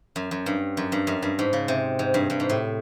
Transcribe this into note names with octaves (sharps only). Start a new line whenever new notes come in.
F#2
F#2
G2
F#2
G2
F#2
G2
G#2
C#3
C3
G#2
G2
G2
G#2
A2